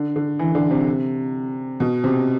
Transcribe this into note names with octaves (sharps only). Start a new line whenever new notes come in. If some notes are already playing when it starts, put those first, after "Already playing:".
Already playing: D3
D3
E3
D3
C3
B2
C3